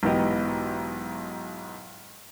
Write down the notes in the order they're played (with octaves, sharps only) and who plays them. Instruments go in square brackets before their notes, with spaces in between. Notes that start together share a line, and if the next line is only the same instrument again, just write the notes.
[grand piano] B1 G#2 E3 B3 G4 D#5